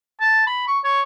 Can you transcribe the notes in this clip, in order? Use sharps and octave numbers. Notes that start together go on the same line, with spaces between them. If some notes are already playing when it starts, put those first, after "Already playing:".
A5
B5
C#6
C#5